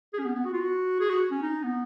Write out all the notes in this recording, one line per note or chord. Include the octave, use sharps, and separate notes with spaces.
G#4
C#4
B3
B3
F#4
F4
F#4
G#4
F#4
C#4
D#4
B3